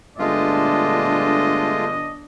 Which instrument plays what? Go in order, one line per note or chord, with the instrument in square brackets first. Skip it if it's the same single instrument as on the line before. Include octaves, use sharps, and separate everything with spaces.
[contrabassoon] G1 [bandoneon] G#3 A3 F4 [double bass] D4 [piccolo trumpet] D#5